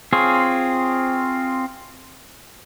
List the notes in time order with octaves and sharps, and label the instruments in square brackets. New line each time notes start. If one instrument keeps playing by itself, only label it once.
[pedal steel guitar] C4 F4 G#4 C#5